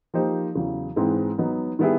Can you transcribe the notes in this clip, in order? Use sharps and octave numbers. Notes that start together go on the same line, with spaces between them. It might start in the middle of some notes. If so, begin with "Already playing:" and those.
F3 A#3 D#4 G4 C5
E2 C#3 F#3
G#2 E3 G#3 C4
F#3 B3 D#4
D#3 G3 B3 E4 G#4